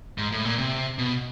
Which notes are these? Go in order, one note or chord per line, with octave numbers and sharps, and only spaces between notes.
G#2
A2
A#2
C3
B2